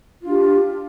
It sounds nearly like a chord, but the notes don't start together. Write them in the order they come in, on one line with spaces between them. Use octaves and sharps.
F4 D4 G4